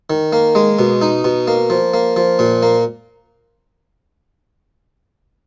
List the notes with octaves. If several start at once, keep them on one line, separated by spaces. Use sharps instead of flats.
D#3
A#3
G#3
B2
D#4
B2
A#3
F3
A#3
F3
A#2
A#3